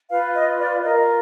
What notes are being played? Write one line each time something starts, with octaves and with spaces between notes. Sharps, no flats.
F4 B4 F5
D#5
D5
F4 A#4 D#5